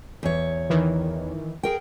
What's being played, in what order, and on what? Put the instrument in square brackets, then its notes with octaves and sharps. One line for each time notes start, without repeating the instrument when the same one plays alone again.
[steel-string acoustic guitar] E2 C#5
[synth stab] D#3 E3
[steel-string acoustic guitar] G#4 A#4 G5